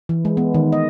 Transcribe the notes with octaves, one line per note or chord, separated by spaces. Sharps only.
E3
G#3
B3
D#3
D#5